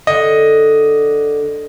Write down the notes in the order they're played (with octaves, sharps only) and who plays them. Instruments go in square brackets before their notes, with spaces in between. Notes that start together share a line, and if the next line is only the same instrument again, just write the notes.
[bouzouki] D3 [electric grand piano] D#5